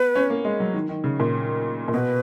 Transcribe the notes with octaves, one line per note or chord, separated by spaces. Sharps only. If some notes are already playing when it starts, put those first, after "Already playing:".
Already playing: B3 B4
C#4
A#3
G#3
F#3
D#3
D#3
C#3
A#2
A#2
B2 B4